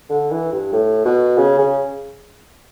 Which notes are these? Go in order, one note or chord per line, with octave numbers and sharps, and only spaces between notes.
D3
E3
G2
A2
B2
C#3
C#3